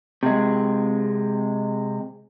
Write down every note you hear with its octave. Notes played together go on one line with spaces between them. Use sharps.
C3 G#3